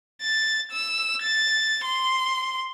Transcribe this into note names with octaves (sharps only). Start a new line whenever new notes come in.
A6
E6
A6
C6